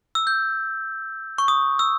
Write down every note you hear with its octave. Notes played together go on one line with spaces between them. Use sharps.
E6
G6
C#6
D#6
E6